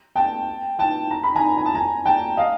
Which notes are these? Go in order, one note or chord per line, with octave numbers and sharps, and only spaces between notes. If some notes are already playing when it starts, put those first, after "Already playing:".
G5 A5
G5 A5
A#5
B5
G#5 A#5
G#5
A5
G#5 A#5
G5 A5
D#5 F5